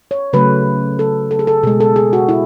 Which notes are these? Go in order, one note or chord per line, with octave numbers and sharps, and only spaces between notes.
C#5
C#3 F#3 A3 B4
A4
A4
G#4
A4
B2 G#3 G#4
A4
G#4
F#4
E4